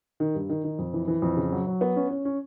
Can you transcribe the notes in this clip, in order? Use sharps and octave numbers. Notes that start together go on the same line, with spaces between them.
D#3
G2
D#3
D#3
F2
E3
E3
F2
C#3
F#3
F#3
B3
C#4
C#4
C#4